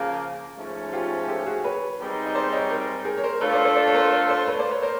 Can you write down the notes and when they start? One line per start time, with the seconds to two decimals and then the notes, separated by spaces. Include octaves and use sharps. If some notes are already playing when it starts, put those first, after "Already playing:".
Already playing: C#3 F3 A#3
0.57 G#2 F3 A3 C#4
0.93 F4 G4
1.28 G4 A4
1.39 G4
1.46 F#4 G#4
1.64 B4 C#5
1.99 G#2 D#3 G3 C4 D#4
2.26 D#5
2.35 C5 D5
2.52 C#5 D#5
2.70 G#4 A#4
3.05 G#4 A#4
3.18 C#5
3.24 A#4 C5
3.40 A3 D4 F4 A4 B4 C#5
3.53 C5 D5
3.65 C5 D5
3.76 C5 D5
3.87 C#5
3.94 A#4 C5
4.12 A#4 C5
4.30 C5 D5
4.47 B4 C#5
4.59 C5 D5
4.71 B4 C#5
4.82 A#4 C5